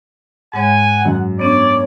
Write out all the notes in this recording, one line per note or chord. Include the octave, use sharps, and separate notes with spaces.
G#2 G#3 C#5 F#5 G#5
F#2
B3 C#4 D4 C#5 D5